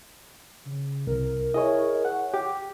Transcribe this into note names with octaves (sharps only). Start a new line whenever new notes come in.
C#3
C2 A#4
E4 G#4 C#5 D#5
F#5
G4 D6